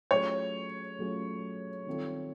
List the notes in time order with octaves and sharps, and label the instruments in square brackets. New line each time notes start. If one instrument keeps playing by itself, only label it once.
[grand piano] F#3 A3 C#4 F4 G#4 [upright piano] C#5
[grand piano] F#3 A3 C#4 F4 G#4
D#3 G3 C4 F4 A4